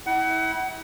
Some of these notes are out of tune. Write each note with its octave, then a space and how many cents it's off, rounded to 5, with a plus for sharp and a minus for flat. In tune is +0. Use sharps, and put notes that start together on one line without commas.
E4 -30 F#5 +30